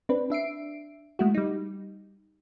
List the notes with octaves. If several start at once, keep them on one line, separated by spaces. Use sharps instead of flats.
C4 D4 B4
D4 E5 C7 D7
G#3 A3 E4 F#4
G3 D#4